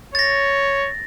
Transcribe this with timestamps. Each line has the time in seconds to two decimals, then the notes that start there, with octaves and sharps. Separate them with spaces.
0.15 C#5 A6 A#6